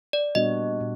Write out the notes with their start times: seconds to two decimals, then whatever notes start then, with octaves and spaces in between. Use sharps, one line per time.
0.13 D5
0.35 A#2 G3 B3 D4 F#4 D#5
0.80 A#2